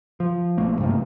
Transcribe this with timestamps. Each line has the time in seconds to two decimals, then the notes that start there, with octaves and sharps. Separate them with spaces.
0.20 F3
0.58 B1 A3 A#3
0.79 G2 C3 F3 A#3